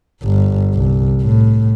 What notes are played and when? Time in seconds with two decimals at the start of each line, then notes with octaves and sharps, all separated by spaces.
0.23 G1
0.74 C2
1.22 A2